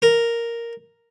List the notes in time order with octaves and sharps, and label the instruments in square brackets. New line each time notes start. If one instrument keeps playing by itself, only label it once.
[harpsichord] A#4